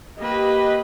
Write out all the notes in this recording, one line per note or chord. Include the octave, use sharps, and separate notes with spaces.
A#3 G4 B4 D#5